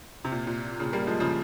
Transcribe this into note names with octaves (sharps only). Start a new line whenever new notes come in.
C3
A#2
A#2
A#2 C#3
G3 A#3
F3 G#3
C#3 F3